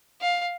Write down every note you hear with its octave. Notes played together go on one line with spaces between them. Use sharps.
F5